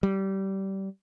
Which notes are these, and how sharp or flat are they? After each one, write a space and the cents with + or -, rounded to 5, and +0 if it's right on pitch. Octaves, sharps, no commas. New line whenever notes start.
G3 -20